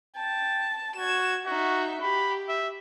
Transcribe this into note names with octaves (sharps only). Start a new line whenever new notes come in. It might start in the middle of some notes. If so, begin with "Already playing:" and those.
G5 A5
F#4 G#6 E7
D#4 F#4 E5
G4 B5
E5